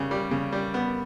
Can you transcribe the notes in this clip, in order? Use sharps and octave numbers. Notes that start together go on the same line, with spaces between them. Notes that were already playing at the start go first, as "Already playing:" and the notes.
Already playing: C#3 G3
G3
C#3
G3
B3